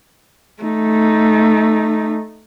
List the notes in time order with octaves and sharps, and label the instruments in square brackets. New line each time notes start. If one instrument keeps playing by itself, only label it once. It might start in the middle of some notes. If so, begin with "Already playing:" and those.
[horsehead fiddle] A3 D#4